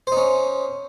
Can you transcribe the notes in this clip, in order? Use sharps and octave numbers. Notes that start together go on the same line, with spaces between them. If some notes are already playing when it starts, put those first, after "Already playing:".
C#4 D#4 C5